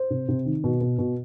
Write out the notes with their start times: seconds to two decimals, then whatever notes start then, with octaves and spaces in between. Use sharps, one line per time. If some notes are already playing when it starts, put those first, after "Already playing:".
Already playing: C5
0.10 C3
0.28 C3
0.46 D#3
0.64 B2
0.81 B2
0.98 B2